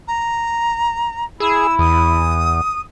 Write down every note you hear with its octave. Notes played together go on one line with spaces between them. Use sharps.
A#5
E4 G#4 E6
E2 D#6